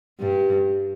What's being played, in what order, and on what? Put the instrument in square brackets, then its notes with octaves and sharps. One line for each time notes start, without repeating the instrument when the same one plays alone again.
[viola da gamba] G2 G3